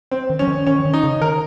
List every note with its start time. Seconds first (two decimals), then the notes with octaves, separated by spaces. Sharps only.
0.11 C4
0.30 D#3
0.39 F3 C#4
0.48 D#3
0.66 D#3 C#4
0.85 D#3
0.94 D#4
1.04 C#3
1.21 D#3 A#4